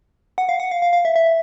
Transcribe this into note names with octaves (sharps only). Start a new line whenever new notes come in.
F#5
F5
F#5
F5
F5
F5
E5
E5